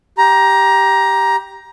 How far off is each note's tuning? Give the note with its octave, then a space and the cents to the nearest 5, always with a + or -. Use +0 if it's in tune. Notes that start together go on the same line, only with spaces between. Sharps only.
G4 +0 A#5 +15